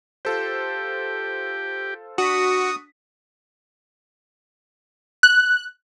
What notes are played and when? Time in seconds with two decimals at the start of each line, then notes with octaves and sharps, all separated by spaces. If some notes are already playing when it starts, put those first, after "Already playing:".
0.25 F4 G4 A4 C5
2.18 D4 F#4 D#6 B6
5.23 F#6